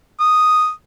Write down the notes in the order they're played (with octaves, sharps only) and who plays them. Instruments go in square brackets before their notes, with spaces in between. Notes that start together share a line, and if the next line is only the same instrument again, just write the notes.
[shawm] D#6